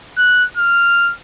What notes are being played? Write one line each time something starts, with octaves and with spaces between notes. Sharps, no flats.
F#6
F6